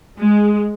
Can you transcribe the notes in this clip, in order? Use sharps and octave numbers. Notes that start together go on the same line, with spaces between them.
G#3